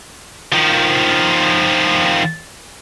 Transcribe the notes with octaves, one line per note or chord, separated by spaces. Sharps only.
D#3 F3